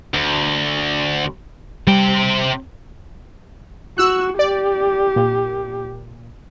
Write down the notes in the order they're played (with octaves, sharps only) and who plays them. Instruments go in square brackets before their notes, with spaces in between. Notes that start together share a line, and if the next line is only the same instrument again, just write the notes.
[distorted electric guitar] D2
[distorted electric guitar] C3 G5 [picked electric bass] G3
[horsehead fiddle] F#4 [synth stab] E6 F#6
[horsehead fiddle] G4 [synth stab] D5
[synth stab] A#2